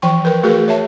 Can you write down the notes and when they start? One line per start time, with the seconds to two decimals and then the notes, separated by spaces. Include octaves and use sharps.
0.02 E3 F3 G5 C#6
0.25 A#4 B4
0.43 A3 F#4 G#4 A#4 B4
0.68 C#5 E5 A5